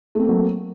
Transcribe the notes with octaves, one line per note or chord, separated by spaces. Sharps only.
F#3 A3 A#3 C4